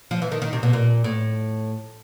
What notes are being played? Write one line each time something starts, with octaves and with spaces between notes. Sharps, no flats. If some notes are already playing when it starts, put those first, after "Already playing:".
F3
E3
D#3
D#3
C3
B2
A#2
A2